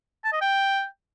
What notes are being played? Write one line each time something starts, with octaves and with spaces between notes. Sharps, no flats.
A5
D#5
G5